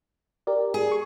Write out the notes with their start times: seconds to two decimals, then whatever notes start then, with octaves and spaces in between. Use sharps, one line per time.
0.47 G4 A#4 D5
0.74 G#4
0.92 C#6